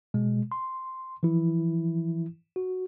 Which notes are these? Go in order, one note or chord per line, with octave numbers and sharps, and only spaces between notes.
B2 G#3
C6
E3 F3 E4
F#4